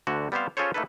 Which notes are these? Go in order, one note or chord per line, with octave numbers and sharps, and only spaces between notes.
D2 D3 F#4
G3 B3 C4 G4 C5 F5
C#4 F4 G#4 A4 C5 C#5
A3 A#3 D#4 E4 A4 B4